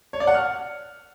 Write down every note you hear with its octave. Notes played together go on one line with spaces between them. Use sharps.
C#5
D5
F#5
F6